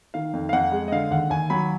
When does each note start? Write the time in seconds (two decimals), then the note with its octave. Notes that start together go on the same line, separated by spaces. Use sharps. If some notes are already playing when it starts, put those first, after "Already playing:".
0.14 D#3 F5
0.33 F2
0.49 F5
0.53 F2 F#5
0.72 G#3
0.88 D#5
0.92 D3 F5
1.11 D#2 F#5
1.30 D#2 G#5
1.50 F#3 B5